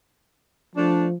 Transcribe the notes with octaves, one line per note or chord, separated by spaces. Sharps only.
F3 A3 D4